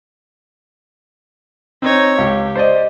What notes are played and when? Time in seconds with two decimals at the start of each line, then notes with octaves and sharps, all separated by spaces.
1.82 C4 D#4 C#5
2.18 C#2 G4
2.56 C5 D5 D#5